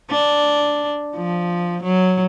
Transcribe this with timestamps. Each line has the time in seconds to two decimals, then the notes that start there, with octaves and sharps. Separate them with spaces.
0.10 D4
1.16 F3
1.83 F#3